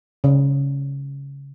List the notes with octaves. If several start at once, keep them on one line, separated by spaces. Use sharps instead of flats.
C#3